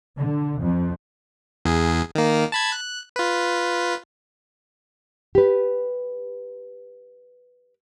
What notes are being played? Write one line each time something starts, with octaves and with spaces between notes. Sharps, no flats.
D3
F2
E2 G#4
D#3 A#3
A5 B5 G#6
F#6
F4 B4
G4 B4